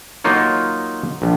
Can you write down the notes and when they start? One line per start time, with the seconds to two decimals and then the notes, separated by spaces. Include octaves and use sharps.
0.24 F#3 A#3 D#4 F4 C#5
1.22 A#1